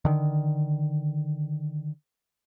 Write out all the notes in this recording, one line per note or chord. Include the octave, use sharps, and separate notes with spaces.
D3 D#3